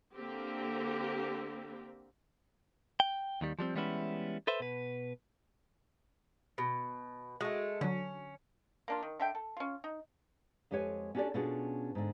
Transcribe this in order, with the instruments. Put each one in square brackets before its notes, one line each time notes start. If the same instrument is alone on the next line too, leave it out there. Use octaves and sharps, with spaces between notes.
[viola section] D3 A#3 C4 G4
[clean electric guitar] G5
D#2 D#3 G3
F3 G3 G#3 C4
E3 G3 G#3 B3 C#4 E4
A4 B4 C5 E5
B2 B4
[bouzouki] B2
[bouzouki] G#3 A3 [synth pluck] F#4
[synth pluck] D3 F#3 [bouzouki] C#4
[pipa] A#3 D4 F4
D#3
D3 E5 G5
A4
C#4 F4
D#4
[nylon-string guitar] F2 G#3 G4 B4 C#5 G#5
C#4 D4 F#4 G4 A4 D5
B2 C#4 D4 F4 F#4 G#4
G#2 D3